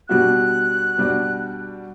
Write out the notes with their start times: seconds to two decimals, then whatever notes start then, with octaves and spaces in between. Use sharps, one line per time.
0.09 B2 G3 D4 F#4 F#6
0.98 B2 G3 D4 F#4